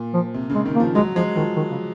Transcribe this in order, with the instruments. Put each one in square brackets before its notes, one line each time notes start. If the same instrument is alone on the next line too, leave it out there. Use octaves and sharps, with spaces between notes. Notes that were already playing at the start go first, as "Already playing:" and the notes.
Already playing: [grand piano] A#2
[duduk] F3
[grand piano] C3
C#3
[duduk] G#3
[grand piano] D#3
[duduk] A#3
[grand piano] F3
[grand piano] F#3 [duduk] G#3
[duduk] F3 [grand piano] G#3
[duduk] D#3 [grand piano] F3
[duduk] D#3
C#3